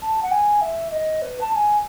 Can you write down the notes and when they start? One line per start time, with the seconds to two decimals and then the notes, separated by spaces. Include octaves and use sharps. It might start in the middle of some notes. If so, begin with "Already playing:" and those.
0.02 A5
0.22 F#5
0.31 G#5
0.61 E5
0.92 D#5
1.22 B4
1.41 A5
1.51 A5
1.55 G#5